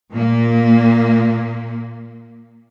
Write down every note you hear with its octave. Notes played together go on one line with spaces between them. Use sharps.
A#2 A#3